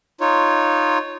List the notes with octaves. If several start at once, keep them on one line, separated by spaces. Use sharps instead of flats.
D#4 F4 C#5